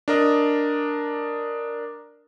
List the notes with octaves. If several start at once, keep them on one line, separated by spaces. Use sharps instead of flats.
D4 A#4 D#5